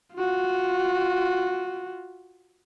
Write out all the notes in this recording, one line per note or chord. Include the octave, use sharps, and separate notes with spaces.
F4 F#4